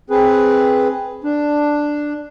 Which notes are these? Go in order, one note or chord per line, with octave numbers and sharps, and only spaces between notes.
C4 G#4 B4
D4